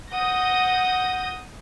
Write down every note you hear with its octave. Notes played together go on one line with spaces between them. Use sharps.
F#5 D#6 G6 A#6